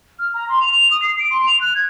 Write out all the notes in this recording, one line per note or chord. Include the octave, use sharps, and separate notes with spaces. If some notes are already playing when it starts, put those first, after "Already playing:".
F6
A#5
C6
F7
F7
D#6
C7
D7
C6
F7
F#6
G#6